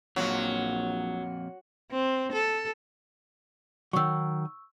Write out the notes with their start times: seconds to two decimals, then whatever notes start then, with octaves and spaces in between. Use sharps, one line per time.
0.16 A#1 F2 A#2 F#3 F4
1.91 C4
2.32 A4
3.93 D#3 F#3 C#6 E6